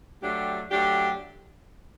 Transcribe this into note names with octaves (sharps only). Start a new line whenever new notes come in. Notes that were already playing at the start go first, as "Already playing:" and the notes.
F#3 A3 D4 G4
F#3 A3 D4 G4